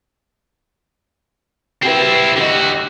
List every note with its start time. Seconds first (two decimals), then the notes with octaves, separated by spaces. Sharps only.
1.83 C4 E4 F#4 G4 B4
2.37 D3 F#4 G4 D#5